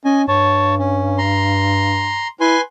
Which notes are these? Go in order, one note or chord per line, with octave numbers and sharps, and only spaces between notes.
C#4 D#5 G#5
G2 C#5 A5
C#4
A#5 C6
E4 B4 G#5 C6